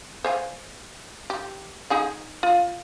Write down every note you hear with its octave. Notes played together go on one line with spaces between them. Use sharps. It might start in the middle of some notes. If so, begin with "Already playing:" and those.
C5 F5 G#5
G4
D#4 G#4 F#5
F4